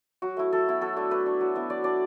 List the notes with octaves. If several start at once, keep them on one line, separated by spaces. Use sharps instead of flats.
F#3 F#4
A3 E4
F#3 A4
B3 E4
F#3 A4
A3 D4
A3 B4
D4
F#3
B3 E4
F#3 D5
D4 D5